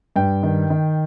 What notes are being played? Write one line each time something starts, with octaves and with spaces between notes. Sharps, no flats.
G2 G5
D#3
D#3